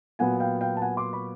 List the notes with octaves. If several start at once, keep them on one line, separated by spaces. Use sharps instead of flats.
A#2 F#3 B3 F#5 G#5
F5 G5
F5 G5
A5
F#5 G#5
C6 D6
B5 C#6